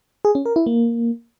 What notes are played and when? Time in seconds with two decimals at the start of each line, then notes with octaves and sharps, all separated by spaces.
0.25 G#4
0.35 C#4
0.46 A#4
0.56 E4
0.66 A#3